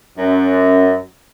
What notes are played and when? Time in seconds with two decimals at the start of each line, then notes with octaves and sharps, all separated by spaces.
0.18 F#2 C#4